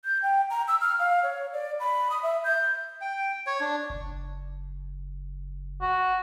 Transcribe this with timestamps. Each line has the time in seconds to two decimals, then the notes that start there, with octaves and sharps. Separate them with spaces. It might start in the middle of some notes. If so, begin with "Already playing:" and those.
0.05 G6
0.22 G5
0.50 A#5
0.68 E6
0.81 F6
0.99 F5
1.23 C#5
1.53 D5
1.80 B5
2.10 D#6
2.23 E5
2.44 G6
3.01 G5
3.47 C#5
3.61 D4
3.90 F#1
5.82 F#4